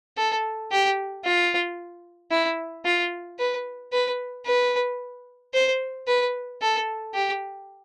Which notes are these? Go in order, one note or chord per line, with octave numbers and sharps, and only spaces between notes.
A4
G4
F4
E4
F4
B4
B4
B4
C5
B4
A4
G4